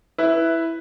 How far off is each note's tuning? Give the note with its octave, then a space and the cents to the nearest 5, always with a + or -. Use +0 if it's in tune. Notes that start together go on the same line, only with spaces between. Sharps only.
E4 +0 B4 +0